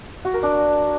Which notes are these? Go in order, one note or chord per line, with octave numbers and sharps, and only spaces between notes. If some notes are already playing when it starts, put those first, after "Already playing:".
F#4
A#4
D4